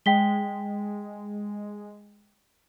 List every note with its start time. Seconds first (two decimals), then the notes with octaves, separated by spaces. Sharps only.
0.06 G#3 G5 B6 G7